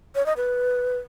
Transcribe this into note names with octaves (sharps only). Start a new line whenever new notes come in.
C#5
D#5
B4